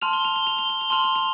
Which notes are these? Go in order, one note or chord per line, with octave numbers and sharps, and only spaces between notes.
A5 C6 F6 F7
G7
F7
G7
F7
G7
F7
G7
A5 C6 F6 F7
G7
F7